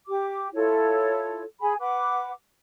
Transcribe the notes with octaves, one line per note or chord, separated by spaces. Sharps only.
G4 D6
E4 F4 A4 C#5
G#4 G#5 B5
B4 F#5 D6